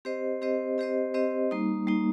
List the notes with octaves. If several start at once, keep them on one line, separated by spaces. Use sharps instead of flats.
C4 G4 C5 D#5
C4 G4 C5 D#5
C4 G4 C5 D#5
C4 G4 C5 D#5
G3 A#3 D#4
G3 A#3 D#4